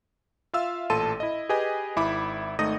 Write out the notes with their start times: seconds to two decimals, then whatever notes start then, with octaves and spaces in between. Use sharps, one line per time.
0.54 F4 E5 F5 E6
0.90 A1 A#2 A4 A5 C6 D#7
1.20 E4 D#5
1.49 G4 G#4 B4 D#5 G#5
1.96 G#1 E4 B5 D6
2.59 G#1 A3 D#4 D#5 D#6 A#6